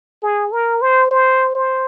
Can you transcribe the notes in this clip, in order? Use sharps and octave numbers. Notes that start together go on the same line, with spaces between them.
G#4
A#4
C5
C5
C5